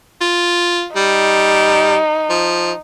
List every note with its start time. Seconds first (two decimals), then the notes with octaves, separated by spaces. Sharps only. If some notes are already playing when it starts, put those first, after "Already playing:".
0.21 F4
0.96 G3 D#4
2.30 F3